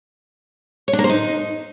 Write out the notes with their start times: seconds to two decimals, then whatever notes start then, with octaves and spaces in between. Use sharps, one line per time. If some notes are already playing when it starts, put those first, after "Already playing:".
0.88 C#5
0.93 D4
0.99 A#3
1.04 C5
1.09 D#4